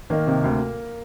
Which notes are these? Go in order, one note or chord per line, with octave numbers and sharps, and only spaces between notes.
D#3 A#3
C3
D2